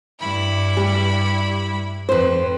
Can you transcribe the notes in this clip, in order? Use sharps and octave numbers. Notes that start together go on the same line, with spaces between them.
G2 E4 B5
G3 G4
F2 B4 C5